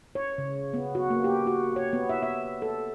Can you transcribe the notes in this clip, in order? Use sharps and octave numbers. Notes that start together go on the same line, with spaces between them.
C#5
C#3
B3
F#4
A#3
G4
F#4
C#5
B3
E5
E5
A4